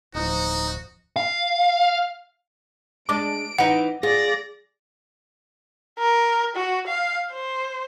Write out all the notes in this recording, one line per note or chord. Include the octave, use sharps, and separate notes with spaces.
D1 F3 D#4 F#4
F5
G#3 D4 D6 D7
E3 C4 D#4 F#5
F4 G#4 D5 A#6
A#4
F#4
F5
C5